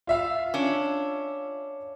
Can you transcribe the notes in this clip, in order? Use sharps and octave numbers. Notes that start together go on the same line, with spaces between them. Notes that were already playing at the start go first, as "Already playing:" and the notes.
F4 E5 F5
C#4 D4